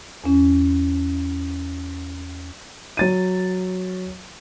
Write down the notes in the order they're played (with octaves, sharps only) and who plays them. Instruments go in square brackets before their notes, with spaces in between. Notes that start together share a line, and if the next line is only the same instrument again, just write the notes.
[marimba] E2 C#4
[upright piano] F#3 A6 D#7